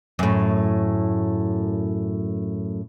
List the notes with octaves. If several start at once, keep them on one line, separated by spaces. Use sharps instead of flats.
F#2 A2